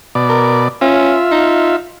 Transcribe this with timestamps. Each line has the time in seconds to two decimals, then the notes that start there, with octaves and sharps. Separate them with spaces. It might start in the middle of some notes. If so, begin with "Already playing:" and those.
0.15 B2 D5
0.29 A#4
0.81 C#4 F4 E5
1.31 D#4